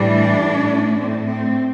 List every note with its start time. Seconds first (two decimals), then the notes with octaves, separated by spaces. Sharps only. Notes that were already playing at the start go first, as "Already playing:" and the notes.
Already playing: A2 E3 G3 D4
0.42 A2 A3
0.99 A2 A3 C4
1.28 C4